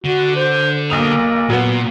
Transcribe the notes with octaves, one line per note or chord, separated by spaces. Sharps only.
D3 F#4
C5
B1 A#3 D#6 F7
A#2 F#3 B3